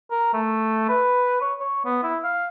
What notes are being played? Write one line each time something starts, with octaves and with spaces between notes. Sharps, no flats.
A#4
A3
B4
C#5
C#5
B3
E4
F5